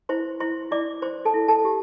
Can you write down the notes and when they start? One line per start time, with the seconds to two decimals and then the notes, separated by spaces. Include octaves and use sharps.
0.09 E4 C5 C6
0.40 E4 C5 C6
0.71 E4 D5 D6
1.02 C5 C6
1.25 A4 A5
1.34 E4
1.48 A4 A5
1.65 G4